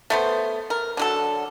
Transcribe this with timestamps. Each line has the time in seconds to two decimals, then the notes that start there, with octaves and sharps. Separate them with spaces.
0.10 A3 B3 C5
0.70 A#4
0.97 D3 F#3 A4